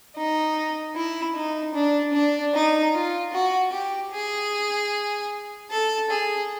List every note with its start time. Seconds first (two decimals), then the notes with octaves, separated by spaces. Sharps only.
0.16 D#4
0.95 E4
1.35 D#4
1.74 D4
2.13 D4
2.54 D#4
2.94 F4
3.33 F#4
3.72 G4
4.12 G#4
5.71 A4
6.10 G#4